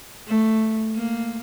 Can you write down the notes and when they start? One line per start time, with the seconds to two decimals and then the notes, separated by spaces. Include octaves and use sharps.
0.27 A3
0.96 A#3